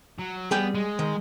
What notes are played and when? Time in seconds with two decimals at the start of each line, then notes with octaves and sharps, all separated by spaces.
0.19 F#3
0.51 G3 B3 G#4 G5
0.75 G#3
0.99 D#3